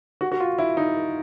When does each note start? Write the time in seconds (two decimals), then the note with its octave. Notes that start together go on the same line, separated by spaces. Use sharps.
0.21 F#4
0.32 F#4
0.40 F4
0.59 E4
0.77 D#4